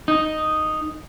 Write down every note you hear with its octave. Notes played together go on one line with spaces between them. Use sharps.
D#4